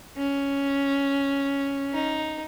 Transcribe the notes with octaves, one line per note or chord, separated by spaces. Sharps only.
C#4
D#4